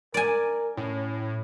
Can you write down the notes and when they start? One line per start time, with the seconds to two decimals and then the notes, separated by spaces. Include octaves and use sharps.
0.14 A#4 D5 G#5
0.77 A2 C#4